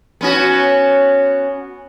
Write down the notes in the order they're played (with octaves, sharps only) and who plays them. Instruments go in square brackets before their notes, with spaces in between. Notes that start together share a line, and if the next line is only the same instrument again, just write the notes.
[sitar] B3 C#4 F#4